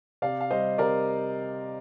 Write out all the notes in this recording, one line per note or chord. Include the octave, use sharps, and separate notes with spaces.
C3 D5 F5
F5
G3 C5 D#5
C3 A#4 D5